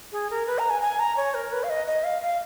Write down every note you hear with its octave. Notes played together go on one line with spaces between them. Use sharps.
G#4
A#4
B4
A#5
G#5
G#5
A#5
C#5
A#4
B4
F5
D#5
D#5
F5
F5